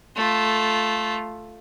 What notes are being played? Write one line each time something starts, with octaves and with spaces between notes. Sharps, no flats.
A3 F4